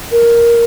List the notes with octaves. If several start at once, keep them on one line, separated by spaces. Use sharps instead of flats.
A#4